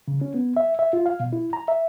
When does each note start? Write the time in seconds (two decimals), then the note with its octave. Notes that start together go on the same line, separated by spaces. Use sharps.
0.08 C#3
0.21 C#4
0.34 B3
0.57 E5
0.79 E5
0.93 F4
1.06 F5
1.20 B2
1.33 E4
1.53 A#5
1.68 E5